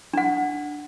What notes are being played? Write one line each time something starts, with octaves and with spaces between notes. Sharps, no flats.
D4 F#5